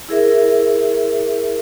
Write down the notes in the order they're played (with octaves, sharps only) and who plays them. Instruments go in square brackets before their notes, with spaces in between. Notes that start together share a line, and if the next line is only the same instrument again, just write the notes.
[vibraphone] E4 G#4 A#4 E5